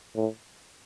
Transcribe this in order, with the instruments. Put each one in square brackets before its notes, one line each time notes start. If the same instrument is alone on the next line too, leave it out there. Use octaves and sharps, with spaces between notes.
[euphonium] A2